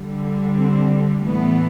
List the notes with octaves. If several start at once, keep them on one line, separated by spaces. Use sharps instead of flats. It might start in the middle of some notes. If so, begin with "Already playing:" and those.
Already playing: D3 G3
C4
A2 E3 A3 B3